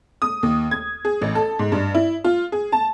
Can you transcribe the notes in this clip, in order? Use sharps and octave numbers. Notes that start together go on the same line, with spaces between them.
D#6
D#2
G#6
G#4
A1
A4
G#2
G2
E4
F4
G#4
A5